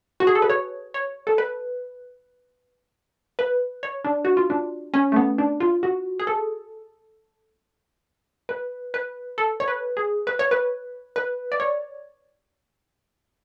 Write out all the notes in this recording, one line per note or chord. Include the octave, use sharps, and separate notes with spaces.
F#4
G#4
A4
B4
C#5
C#5
A4
B4
B4
C#5
D4
F#4
F4
D4
C#4
A3
B3
D4
F4
F#4
G#4
A4
B4
B4
A4
C#5
B4
G#4
B4
C#5
B4
B4
D5
C#5